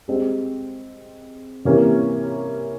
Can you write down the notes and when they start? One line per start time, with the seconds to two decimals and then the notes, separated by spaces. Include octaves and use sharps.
0.08 G#3 C4 G4
1.65 C3 E3 A#3 C#4 G4